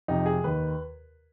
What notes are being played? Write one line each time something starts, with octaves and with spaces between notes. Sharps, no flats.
F2 C3 F3 D#4
G#4
D#2 D#3 B4